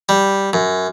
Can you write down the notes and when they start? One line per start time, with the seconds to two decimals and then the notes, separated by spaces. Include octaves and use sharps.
0.09 G3
0.53 F#2